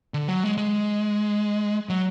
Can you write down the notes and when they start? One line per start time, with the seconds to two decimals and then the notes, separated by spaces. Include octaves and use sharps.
0.14 D3
0.28 F#3
0.43 G#3
0.58 G#3
1.89 F#3